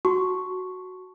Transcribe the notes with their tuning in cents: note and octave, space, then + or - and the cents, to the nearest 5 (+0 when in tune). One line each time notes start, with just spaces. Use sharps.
F#4 +0 A5 +0 C#6 +0